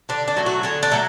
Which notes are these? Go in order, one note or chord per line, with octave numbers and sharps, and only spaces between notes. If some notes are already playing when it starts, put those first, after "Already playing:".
D3 D4
D4
F#3 A3
F#4
D3 G#4
D4
F#3 A3